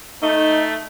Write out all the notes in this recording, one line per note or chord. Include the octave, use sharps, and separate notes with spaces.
A3 D#4